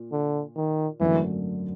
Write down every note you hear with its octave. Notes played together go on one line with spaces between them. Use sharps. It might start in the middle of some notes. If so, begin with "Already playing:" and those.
Already playing: A#2
D3
D#3
G#1 F#2 D3 E3 F#3 A3